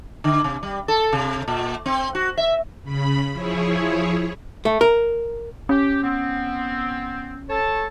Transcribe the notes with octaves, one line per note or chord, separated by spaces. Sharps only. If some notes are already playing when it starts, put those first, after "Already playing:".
D3
C3
G3
A4
C3
A#2
C4
F#4
E5
C#3 B5
F3 E4 G#4 C#5
A3
A#4
C#4 G4
B3 C4
A4 C#5 A5